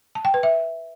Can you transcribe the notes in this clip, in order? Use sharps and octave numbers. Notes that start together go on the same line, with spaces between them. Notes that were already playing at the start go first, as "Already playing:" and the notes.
A5
G5
B4
E5